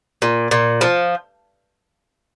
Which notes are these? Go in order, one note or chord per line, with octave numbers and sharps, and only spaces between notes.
A#2
A#2
F3